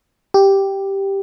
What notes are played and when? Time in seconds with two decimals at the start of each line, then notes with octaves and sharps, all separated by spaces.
0.34 G4